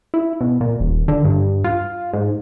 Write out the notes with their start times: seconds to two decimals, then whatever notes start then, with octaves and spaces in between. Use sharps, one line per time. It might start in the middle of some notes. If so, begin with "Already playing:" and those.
0.14 E4
0.41 B2
0.61 A#2
0.80 D#1
1.08 D3
1.24 G2
1.64 F4
2.13 G#2